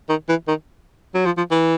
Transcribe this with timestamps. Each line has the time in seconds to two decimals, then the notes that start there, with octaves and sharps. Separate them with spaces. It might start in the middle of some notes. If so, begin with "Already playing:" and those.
0.09 D#3
0.29 E3
0.48 D#3
1.14 F#3
1.26 F3
1.37 F3
1.51 E3